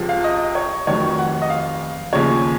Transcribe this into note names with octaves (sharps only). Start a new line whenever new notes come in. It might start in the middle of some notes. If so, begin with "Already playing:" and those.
Already playing: C#2 C3 F3
F5
D#5
C#5
F1 F2 D#3 F#3 C#5
F#5
D#5
F5
D#2 C#3 F3 C#5